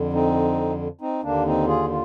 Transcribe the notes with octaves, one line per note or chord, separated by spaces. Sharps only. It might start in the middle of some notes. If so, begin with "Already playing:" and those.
Already playing: F2 D3
C4 D#4
C4 D#4
D#2 D3 A#3 D4
C4 D#4
F4 G#4
F4